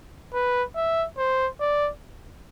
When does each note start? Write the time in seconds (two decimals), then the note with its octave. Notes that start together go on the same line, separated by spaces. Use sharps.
0.34 B4
0.76 E5
1.18 C5
1.60 D5